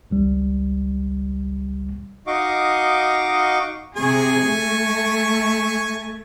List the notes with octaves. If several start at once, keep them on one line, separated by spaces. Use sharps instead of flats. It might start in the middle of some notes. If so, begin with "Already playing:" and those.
G#1 C#2 G3
D#4 F#4 D#5 F5 C#6 D6
C3 G#4 G#5 C#6
A3